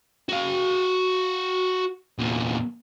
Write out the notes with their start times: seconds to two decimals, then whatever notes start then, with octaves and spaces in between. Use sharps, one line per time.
0.29 F#4 F5
2.19 E2 A#2